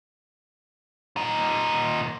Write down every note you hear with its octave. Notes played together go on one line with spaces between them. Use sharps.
A#2 D#4